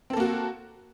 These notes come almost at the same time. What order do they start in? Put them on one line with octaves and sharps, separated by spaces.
C4 A4 A#3 F#4